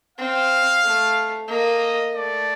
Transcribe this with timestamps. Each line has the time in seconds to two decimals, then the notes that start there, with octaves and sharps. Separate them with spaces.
0.18 C4 F5
0.84 A3
1.49 A#3 D#5
2.15 A3 D5